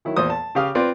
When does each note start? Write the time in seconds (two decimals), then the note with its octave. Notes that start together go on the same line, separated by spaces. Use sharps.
0.05 D#3 F#3 E4
0.16 E2 A#2 C5 D#6
0.30 A5
0.55 C#3 G4 F5 D#6 F6
0.75 C4 F4 B4 D5